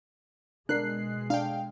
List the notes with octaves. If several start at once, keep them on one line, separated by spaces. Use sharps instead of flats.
B2 G#3 D4 A#4 F#6 C7
D4 F5 G5